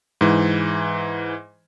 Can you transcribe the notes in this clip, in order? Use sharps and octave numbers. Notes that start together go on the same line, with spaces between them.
G#2 E3